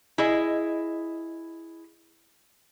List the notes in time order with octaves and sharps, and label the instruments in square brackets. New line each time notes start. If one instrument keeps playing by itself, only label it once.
[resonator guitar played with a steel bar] E4 G#4 D#5